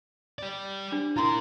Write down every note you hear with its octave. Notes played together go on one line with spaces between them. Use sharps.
G4 D5
D4
E4 F4 A#4 A#5 C6